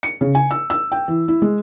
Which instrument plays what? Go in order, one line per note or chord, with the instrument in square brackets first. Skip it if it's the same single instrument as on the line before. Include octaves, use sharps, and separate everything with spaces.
[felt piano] C#7
C#3
G#5
E6
E6
G5
E3
E4
G#3